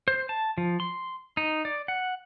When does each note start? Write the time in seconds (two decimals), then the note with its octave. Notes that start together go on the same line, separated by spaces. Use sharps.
0.08 C5
0.29 A5
0.58 F3
0.80 C6
1.37 D#4
1.65 D5
1.88 F#5